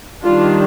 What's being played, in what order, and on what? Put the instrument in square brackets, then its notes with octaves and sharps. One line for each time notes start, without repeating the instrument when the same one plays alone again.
[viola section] D#3 G3 D4 F4